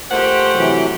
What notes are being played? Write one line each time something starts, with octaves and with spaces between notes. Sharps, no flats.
A3 F4 G4 A#4 C5 F#5
C3 E3 F#3